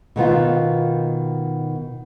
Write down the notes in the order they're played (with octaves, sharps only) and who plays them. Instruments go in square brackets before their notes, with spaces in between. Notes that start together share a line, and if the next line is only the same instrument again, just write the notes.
[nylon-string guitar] B2 D#3 B3 F4